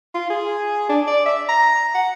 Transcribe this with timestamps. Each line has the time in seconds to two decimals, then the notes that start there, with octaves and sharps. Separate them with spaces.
0.14 F4
0.30 G#4
0.89 D4
1.07 D5
1.26 E5
1.49 A#5
1.95 F#5